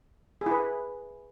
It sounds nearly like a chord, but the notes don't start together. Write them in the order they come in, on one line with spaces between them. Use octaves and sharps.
G#4 E4 B4